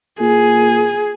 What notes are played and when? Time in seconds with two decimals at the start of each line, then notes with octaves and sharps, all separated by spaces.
0.20 A#2 G#4